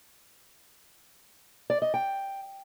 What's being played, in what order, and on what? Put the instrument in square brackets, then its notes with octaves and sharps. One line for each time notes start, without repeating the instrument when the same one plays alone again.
[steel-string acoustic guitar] D5
D#5
G5